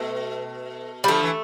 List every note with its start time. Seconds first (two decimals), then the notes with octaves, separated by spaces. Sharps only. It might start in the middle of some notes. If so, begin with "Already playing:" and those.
Already playing: B2 A3
1.04 G3
1.08 D3 F3 A3
1.23 E3